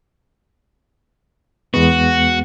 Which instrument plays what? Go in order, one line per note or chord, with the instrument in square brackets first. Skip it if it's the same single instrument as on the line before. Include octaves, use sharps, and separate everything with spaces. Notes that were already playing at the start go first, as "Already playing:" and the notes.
[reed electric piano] E2 G#3 B3 [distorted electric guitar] F#4